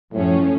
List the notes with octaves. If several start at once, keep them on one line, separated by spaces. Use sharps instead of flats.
F#2 A2 F3 A3 C#4